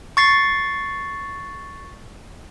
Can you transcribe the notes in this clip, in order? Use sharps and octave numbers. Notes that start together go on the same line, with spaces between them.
C#6 A6 C7